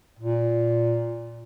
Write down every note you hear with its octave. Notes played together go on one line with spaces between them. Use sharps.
A#2